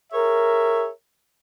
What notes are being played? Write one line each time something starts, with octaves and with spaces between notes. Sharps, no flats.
G#4 A#4 C#5 E5